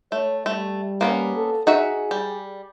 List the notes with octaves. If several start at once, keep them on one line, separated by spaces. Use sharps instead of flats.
A3 C#5
G3 A3
A#3 B3 C#4
A4
D#4 F#4 G#4 E5
G3